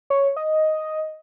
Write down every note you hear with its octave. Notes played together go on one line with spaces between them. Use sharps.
C#5
D#5